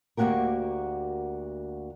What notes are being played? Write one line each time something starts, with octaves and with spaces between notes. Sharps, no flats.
D2 A#3 C#4 F#4 G4 A#4